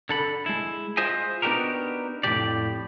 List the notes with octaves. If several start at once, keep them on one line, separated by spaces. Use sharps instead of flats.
D3 A4 B5
G#3 E4
F4 G#4 C5 D#5 E5 G#5
B3 D4 D#4 F#4 G4 A#4
F2 A2 E3 F3 G4 D5